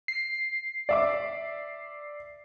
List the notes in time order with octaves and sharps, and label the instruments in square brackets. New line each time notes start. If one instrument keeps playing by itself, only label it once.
[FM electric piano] C7
[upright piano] D5 E5 D6